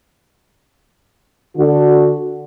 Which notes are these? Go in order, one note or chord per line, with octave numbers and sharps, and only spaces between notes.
D3 F#4